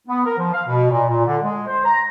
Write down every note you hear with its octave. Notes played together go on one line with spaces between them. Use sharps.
B3
A#4
F3
F5
B2
A#2
A#2
D3
G#3
C5
A#5